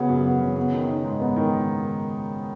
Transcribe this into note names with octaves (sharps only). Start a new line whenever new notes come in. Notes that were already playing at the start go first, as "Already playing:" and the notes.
Already playing: C#3 B3 F#4
F#2
B3
C#3
B3
D#3
D#4
G#2
B3
D#3